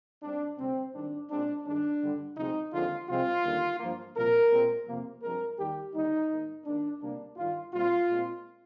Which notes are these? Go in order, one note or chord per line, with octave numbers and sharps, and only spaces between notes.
G#2 G3 C4 D4
D2 C3 G3 C4
G#2 D#3 G3 C4 D4
A#2 G#3 C4 D4
G2 D#3 G#3 D4
G2 D3 G3
D2 C3 F3 G#3 C4 D#4
D#2 D3 F3 G#3 C4 F4
C2 C3 F3 G#3 C4 F4
D#2 D3 G3 A#3
G2 F3 A#3
C2 A#2 F3 A#3 A#4
A#2 G#3 C4
F2 C3 F3 A#3
G2 F3 G#3 C4 A#4
D#2 D#3 G3 G4
D#2 D3 G3 D#4
G#2 D#3 A#3
G#2 D#3 A#3 D4
D2 C3 G3 A#3 D4
G2 D#3 G3 F4
A#2 G3 C4 F4
A#2 G#3 C4